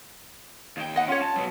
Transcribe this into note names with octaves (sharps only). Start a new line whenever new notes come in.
D#2 G5
D#5 F#5
C#4 F4 C#5
A5
F#3 B3